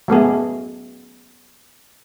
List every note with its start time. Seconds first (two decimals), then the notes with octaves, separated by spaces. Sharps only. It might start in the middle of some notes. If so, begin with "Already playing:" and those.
0.08 F#3 A3 B3 G#4